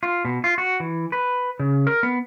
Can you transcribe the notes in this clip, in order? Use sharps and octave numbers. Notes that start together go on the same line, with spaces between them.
F4
B2
F4
F#4
E3
B4
C#3
A#4
B3